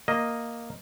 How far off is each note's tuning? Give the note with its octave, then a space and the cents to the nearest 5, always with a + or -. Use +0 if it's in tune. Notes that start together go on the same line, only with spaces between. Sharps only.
A#3 +0 D#5 +0